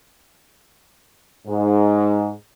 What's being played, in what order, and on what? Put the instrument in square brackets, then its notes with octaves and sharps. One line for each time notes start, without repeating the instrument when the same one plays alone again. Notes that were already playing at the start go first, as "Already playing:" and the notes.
[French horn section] G#2